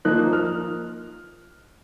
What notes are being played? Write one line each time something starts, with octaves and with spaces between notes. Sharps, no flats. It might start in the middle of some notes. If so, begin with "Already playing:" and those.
F3 A#3 D#4 F#6
F6